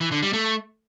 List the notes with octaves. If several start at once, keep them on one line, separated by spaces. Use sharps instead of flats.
E3
D3
G3
A3